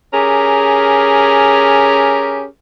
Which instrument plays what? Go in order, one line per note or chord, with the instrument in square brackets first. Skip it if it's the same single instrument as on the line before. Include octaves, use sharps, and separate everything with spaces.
[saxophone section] C#4 G4 G#4 A#4